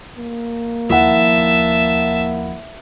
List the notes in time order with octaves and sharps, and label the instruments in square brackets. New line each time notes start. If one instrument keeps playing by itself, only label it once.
[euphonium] A#3
[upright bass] D#2 F3 [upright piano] E4 F#5 [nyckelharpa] E5 A5